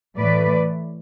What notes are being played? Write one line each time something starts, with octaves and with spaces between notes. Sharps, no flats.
A2 E3 A3 B4 D5